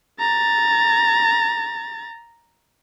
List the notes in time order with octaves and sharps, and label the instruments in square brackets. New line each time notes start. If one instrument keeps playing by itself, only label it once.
[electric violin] A#5 A6